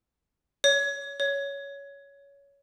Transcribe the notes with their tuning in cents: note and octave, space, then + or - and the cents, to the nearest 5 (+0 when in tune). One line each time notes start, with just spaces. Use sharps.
C#5 +20
C#5 +15